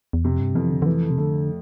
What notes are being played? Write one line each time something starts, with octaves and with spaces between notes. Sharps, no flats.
E2
F2 C3
G2
F2 E3
D3
D3
E3 A3
C3
D3 A3